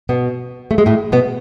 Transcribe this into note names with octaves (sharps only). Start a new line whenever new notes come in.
B2 B3
A3
G#3
A2 A3
B2 B3